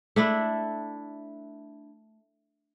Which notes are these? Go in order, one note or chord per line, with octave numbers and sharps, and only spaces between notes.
A3 D4 E4